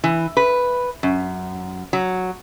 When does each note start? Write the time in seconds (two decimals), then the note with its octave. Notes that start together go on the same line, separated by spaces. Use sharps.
0.04 E3
0.37 B4
1.03 F#2
1.93 F#3